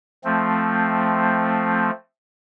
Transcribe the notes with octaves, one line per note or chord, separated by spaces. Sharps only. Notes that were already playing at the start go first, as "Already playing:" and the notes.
F3 A3 C4